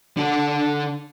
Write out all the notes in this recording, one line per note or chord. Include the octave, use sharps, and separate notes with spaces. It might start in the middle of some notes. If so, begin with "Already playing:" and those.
D3 A4